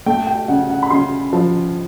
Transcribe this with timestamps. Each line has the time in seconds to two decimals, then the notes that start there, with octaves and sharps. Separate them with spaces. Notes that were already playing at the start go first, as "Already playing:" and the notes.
0.06 A3 G5
0.27 G5
0.48 C#3 F#5
0.70 F#5
0.83 B5
0.90 C#3 C6
1.33 F3